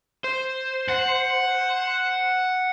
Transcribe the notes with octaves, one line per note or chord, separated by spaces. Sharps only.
C5
F#5